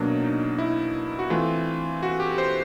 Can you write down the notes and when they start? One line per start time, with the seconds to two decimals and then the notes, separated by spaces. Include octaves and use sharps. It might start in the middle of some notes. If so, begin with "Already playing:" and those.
Already playing: B2 F#3 A#3 D4
0.22 D#4
0.58 E4
1.19 F#4
1.30 E3 A3 C4 F4
2.03 F#4
2.20 G4
2.38 C5